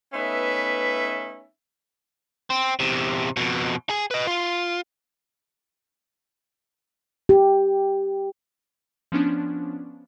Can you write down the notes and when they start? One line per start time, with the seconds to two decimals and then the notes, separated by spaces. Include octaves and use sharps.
0.14 A3 B3 C#4 D#4 B4 E5
2.50 C4
2.80 E2 C3
3.37 F2 B2
3.90 G#4 G#5
4.11 B4 D#5
4.27 F4
7.29 G4
9.12 F3 B3 C#4 D4